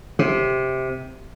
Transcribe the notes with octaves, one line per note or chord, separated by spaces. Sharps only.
C3